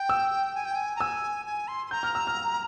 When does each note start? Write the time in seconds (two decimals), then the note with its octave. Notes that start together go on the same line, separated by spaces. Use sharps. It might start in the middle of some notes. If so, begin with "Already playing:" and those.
Already playing: G5
0.09 E6
0.55 G#5
0.65 G5
0.75 G#5
0.96 A#5
1.00 G#5 E6
1.46 G#5
1.68 C6
1.87 C6
1.91 A#5 G6
2.03 F6
2.15 E6
2.27 F6